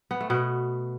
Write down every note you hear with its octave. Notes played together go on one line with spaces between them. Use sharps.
B3
A3
B2 B3